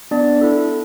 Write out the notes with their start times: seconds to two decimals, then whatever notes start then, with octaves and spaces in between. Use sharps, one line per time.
0.11 B3 D4 D5
0.41 E4 A4